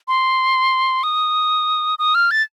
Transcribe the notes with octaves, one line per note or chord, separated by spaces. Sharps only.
C6
D#6
D#6
F6
A6